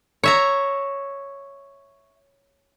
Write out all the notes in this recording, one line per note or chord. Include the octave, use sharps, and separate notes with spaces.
C#5 E5 A#5